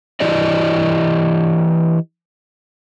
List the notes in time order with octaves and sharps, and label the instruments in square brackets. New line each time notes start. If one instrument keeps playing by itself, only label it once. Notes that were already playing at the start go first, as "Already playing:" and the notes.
[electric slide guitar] E3 E4 G4 D5 D#5